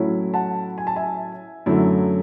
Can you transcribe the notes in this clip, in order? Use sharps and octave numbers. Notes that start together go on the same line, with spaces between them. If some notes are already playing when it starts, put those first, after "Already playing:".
Already playing: A2 F#3 A3 C#4 E4
F#5 A5
G#5
A5
E5 G#5
F#2 D3 F#3 A3 E4